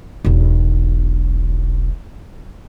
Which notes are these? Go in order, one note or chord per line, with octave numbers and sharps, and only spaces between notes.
E1 B1